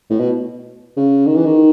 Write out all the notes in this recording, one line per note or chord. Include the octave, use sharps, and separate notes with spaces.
A2
B2
C#3
D#3
E3
D#3